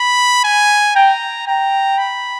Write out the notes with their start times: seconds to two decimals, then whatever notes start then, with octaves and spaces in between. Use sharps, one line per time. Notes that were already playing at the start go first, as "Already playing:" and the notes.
Already playing: B5
0.44 G#5
0.95 G5 A#5
1.47 G5 A#5
1.98 B5